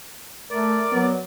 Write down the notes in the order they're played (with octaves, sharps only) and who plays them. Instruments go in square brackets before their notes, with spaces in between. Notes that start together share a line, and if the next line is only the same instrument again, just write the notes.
[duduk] A3 [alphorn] A#4 [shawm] D5
[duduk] F#3 [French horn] B3